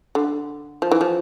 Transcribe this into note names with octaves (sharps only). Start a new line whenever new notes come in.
D3
F3
E3
F3